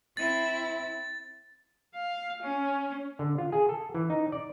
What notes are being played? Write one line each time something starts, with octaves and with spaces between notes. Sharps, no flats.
C4 E4 A6
F5
C#4
D3
F4
G#4
A4
E3
D#4
D5